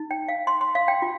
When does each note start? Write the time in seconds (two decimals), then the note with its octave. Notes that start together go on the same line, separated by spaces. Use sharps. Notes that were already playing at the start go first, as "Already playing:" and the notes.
Already playing: D#4
0.11 G5
0.28 F5
0.47 C6
0.61 C6
0.75 F5
0.88 G5
1.02 F4